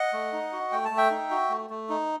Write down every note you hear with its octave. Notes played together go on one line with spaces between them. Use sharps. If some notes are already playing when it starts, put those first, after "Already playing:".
Already playing: D#5 F#5
A3
D#4
F#4
A3 G5
A5
A3
E5 G5
D#4
F#4
A3
A3
D#4